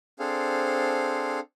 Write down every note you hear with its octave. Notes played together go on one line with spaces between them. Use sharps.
C4 D4 G#4 A4 C5 F5